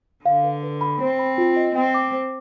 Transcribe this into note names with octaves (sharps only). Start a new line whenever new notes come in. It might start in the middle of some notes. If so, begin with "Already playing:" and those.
D3 F5
B4
B4
B5
C4 C5
B5
F4
D#5
C4 G5
D6
C5